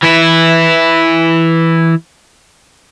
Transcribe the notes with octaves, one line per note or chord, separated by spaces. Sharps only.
E3 E4